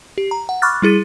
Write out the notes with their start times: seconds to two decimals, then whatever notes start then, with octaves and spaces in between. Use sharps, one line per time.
0.18 G4
0.31 A#5
0.49 F#5
0.62 B5 C#6 D6 F6 F#6 A6
0.82 G3 E4 G#4 A6 D#7